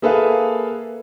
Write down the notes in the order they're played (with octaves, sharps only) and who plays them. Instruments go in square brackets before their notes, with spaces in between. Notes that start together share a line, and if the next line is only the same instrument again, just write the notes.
[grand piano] A#3 G#4 A4 B4 E5 F5